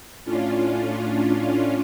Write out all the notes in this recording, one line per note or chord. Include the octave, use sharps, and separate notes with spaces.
A2 C#4 D4 F4